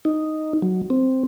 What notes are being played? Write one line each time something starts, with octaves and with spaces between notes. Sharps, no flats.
D#4
F#3
C4